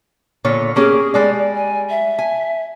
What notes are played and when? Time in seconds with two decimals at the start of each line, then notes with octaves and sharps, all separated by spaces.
0.45 A#2 D3 C#5
0.76 A#3 C#4 G4 G#4
1.14 G3 G#3 D5
1.55 G#5
1.90 E5
2.19 G#5